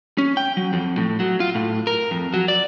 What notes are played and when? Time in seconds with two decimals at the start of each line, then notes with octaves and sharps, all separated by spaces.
0.18 C#4
0.37 G5
0.57 F#3
0.73 F2
0.97 A2
1.20 F#3
1.40 F4
1.55 A2
1.87 A#4
2.11 F2
2.34 F#3
2.48 D5